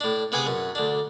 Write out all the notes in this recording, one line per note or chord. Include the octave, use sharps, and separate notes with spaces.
A2 D4
C3 B3 G#4 G#5 D6 D#6
F#2
D2 D4